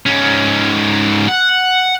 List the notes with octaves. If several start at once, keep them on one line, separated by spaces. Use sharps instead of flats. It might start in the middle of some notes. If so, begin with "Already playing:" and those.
G#2 C#4
F#5